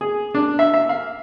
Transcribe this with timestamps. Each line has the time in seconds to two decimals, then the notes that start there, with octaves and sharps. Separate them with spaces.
0.01 G#4
0.34 D4
0.59 E5
0.74 E5
0.89 F5